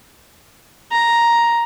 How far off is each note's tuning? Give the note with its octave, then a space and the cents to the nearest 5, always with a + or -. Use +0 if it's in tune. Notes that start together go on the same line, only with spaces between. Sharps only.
A#5 +5